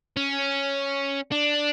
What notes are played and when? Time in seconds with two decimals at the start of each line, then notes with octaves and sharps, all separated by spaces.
0.17 C#4
1.32 D4